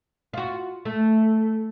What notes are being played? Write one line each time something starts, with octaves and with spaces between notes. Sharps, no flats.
F4 F#4
A3